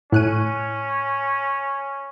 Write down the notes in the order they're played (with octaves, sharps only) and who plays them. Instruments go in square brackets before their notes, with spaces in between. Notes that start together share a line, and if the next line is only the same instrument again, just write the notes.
[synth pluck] A2 F#6 D#7 [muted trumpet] C#4